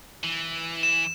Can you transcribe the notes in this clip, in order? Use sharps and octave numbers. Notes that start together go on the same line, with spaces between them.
E3
E7